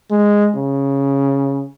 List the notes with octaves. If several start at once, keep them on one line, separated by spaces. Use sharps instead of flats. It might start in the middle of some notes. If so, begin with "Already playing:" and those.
G#3
C#3